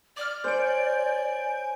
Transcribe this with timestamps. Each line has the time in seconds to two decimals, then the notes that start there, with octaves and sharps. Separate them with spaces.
0.17 D5 D6 F6
0.44 C5 C#5 G#5 G6 D7